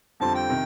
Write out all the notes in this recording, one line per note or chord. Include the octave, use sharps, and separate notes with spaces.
F2 D3 G3 C4 F4 A5
G5
C3 D#3